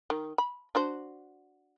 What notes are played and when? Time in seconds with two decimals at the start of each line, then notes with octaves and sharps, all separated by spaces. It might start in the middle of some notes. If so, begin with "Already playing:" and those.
0.10 D#3
0.38 B5
0.75 D4 F#4 C5